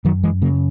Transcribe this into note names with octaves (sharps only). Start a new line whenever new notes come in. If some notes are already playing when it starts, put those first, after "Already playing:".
F#2 D#3 F#3
E3 G#3
C#3 F#3 A#3